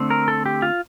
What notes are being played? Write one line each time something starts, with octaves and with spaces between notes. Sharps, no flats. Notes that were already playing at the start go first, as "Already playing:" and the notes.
Already playing: D3 A3 C4
A#4
A4
G4
F4